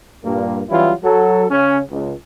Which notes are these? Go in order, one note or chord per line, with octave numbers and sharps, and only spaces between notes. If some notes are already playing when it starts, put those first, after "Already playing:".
G2 A#2 A#3
E3 F#3 G3 C#4 E4 F4
F#3 A4
C#3 C#4
C#2